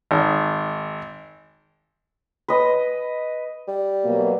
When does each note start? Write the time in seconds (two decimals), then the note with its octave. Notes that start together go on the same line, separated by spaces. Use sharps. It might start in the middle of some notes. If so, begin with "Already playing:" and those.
0.11 G#1
2.48 B4 D#5
3.68 G3
4.04 B2 F#3 A#3